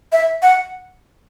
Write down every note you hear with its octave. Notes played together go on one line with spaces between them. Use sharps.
E5
F#5